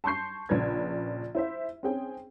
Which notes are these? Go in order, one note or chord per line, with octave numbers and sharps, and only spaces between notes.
A5 C6 C#6 G6 C7
A#1 C#3 B4 G#6
E4 C5 E5
C4 C#4 G#4 G5